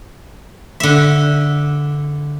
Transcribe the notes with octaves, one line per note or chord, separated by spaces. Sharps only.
D3 E5